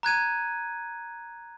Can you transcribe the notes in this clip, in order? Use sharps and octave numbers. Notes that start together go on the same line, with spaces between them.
A#5 F#6 G#6 D#7